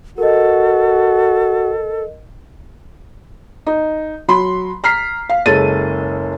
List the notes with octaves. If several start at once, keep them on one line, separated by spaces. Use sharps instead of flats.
F#4 A4 A#4 D#5
D#4
F#3 B5 C6
A#5 F6 B6 C7
F5
F#1 G#3 A4 C#5 A6 D#7